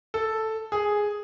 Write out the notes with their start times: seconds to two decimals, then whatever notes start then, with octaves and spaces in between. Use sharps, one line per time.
0.14 A4
0.72 G#4